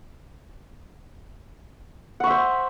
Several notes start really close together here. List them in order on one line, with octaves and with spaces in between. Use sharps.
F#5 C#6 E5 C5